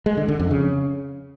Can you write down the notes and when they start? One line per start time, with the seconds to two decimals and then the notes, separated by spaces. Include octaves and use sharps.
0.06 G#3
0.17 D3
0.28 D3
0.40 F2
0.51 C#3